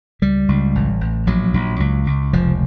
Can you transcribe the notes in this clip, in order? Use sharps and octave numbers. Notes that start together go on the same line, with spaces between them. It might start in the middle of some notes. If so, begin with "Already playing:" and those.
C#2 G3
C#2
A1
A1
A#1 F#3
A#1
C#2
C#2
F1 F3